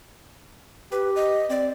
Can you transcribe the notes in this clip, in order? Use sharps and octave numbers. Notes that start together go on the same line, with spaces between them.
G4 B4
D#5
C4 D5